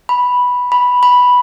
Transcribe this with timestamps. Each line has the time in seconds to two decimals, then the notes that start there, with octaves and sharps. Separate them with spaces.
0.09 B5
0.72 B5
1.03 B5